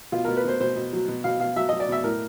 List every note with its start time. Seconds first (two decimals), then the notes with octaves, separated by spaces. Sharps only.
0.12 B2 F4
0.25 B2 A#4
0.37 B4
0.44 B2 C5
0.60 B2 C5
0.76 B2
0.93 F#3
1.08 B2
1.24 B2 F5
1.40 B2 F5
1.56 F#3 E5
1.69 D#5
1.73 F#3
1.80 D5
1.88 B2 E5
2.04 A2 A#4